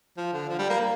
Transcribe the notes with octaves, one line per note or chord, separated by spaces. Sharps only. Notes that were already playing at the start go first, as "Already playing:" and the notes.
F3
D3
F3
G3
A#3
A#3